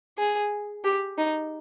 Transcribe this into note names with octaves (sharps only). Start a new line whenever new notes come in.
G#4
G4
D#4